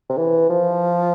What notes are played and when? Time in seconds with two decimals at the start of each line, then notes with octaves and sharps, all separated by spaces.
0.10 C3
0.18 E3
0.50 F3